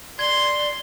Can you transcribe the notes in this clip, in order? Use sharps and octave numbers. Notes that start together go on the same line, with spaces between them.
D5 C6 G#6 G7